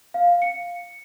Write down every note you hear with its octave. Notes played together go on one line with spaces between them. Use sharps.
F5
C#7